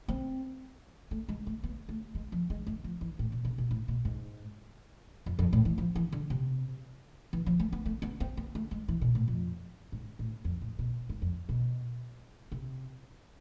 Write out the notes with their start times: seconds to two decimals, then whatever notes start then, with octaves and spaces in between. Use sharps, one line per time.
0.08 C4
1.11 A3
1.28 G#3
1.47 A3
1.63 B3
1.89 A3
2.15 G#3
2.32 F3
2.50 G#3
2.67 A3
2.84 F3
3.01 E3
3.19 A2
3.32 B2
3.45 C3
3.58 B2
3.71 A2
3.88 B2
4.05 G#2
5.26 F2
5.39 F2
5.53 A2
5.65 E3
5.78 F3
5.95 E3
6.12 D3
6.30 C3
7.33 E3
7.46 F3
7.59 A3
7.72 B3
7.85 A3
8.02 B3
8.20 C4
8.37 B3
8.55 A3
8.71 G#3
8.88 E3
9.01 B2
9.15 A2
9.28 F2
9.92 G#2
10.19 A2
10.45 F2
10.61 A2
10.79 B2
11.09 G#2
11.22 F2
11.49 B2
12.52 C3